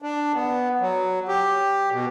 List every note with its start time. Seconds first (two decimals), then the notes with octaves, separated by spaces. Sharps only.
0.02 D4
0.35 B3
0.81 F#3
1.28 G4
1.91 B2